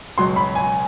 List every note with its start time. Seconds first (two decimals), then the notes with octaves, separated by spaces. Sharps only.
0.18 C#2 B2 F#3 C6
0.36 B5
0.55 G#5